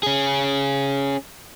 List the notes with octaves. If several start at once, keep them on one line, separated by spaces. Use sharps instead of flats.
C#4 G#4